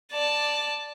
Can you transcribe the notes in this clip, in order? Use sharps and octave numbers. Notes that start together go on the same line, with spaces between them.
D5 A5